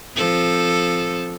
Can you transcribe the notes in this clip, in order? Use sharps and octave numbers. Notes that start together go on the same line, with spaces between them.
F3 C4 A4